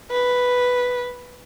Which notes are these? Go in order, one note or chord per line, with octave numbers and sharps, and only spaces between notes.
B4